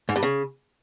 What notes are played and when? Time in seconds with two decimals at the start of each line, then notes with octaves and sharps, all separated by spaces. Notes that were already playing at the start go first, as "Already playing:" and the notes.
0.09 G#2
0.16 G2
0.23 C#3